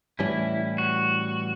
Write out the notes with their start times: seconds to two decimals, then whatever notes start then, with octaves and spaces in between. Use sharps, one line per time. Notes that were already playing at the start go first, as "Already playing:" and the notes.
0.19 A2 E3 G3 C#4 E4
0.78 F#4